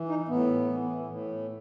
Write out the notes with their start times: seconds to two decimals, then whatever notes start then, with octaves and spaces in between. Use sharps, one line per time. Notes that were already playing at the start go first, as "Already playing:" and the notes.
Already playing: E3
0.09 D#4
0.28 A2 B3
0.67 E3
1.07 A2